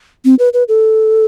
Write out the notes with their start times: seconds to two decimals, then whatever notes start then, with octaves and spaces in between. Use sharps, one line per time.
0.25 C4
0.39 B4
0.54 B4
0.68 A4